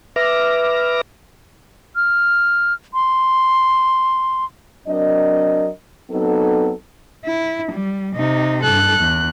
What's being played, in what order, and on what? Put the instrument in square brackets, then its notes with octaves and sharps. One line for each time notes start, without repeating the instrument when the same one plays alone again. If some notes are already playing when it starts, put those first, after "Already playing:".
[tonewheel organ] B4 E5 D6 F6 A#6
[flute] F6
C6
[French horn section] F#3 C4 D4 A#4 D#5
F#3 B3 C4 D#4 A4
[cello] E4
G3
C3 D#4
[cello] G2 A4 [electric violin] F#6
[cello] E2